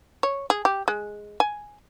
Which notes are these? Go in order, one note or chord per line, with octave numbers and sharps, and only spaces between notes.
C#5
G#4
G4
G#3
G#5